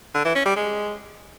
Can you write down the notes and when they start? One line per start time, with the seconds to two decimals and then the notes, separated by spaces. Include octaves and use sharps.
0.14 D3
0.25 E3
0.35 C#4
0.46 G3
0.56 G#3